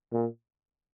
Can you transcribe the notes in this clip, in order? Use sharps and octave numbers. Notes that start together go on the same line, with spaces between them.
A#2